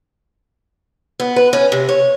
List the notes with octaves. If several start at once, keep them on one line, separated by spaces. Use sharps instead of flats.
B3
B4
C#4
C3
C#5